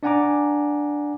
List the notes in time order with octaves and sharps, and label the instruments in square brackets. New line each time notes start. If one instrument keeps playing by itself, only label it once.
[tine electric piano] D4 D5 F#5 G#5 A#5 D6